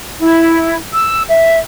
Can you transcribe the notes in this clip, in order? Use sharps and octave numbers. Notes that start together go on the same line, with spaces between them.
E4
E6
E5